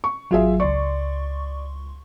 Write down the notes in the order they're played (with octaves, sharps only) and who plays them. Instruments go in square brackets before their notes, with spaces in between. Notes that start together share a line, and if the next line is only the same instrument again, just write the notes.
[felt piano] C#6
[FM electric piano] G#1 F#3 [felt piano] F4 G#4 E5
[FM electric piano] C#2 C6 C#6 [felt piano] D5